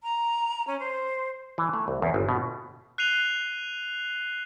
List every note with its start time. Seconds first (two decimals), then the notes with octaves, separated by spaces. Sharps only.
0.03 A#5
0.67 C#4
0.80 C5
1.58 E3
1.73 A3
1.88 C2
2.02 E2
2.14 G1
2.29 B2
2.98 F#6 C7 D#7 F7 G7